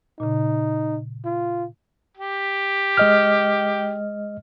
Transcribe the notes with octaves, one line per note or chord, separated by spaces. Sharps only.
A#2 C#3 D#4
F4
G4
G#3 D#5 F6